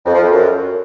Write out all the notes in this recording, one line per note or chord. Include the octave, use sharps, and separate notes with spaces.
F2
F3
F2
F#2